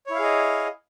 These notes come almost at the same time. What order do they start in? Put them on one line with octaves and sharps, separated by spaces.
C#5 E4 F5 G#4 D#5